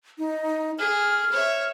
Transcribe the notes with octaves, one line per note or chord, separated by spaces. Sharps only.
D#4
G#4 F6
C#5 E5